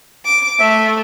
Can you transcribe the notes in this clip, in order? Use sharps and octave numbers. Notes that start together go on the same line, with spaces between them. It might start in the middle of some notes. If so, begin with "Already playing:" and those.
D6
A3 E5